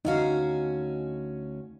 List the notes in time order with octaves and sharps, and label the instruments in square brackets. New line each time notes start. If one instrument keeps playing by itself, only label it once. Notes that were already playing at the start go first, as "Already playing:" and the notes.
[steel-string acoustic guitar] D2 C#4 F#4 [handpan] D#4 F5